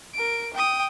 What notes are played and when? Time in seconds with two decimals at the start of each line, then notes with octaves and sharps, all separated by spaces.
0.14 A#4 D7
0.53 G5 D#6